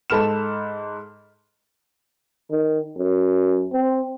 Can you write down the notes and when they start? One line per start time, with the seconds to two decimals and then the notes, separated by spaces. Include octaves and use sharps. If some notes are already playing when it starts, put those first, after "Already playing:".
0.10 G#2 A4 B5 F6 E7
2.51 D#3
2.97 F#2
3.73 C4